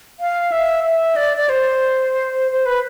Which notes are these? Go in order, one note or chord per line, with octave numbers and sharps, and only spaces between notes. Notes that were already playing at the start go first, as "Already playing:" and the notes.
F5
E5
E5
D5
D5
C5
C5
B4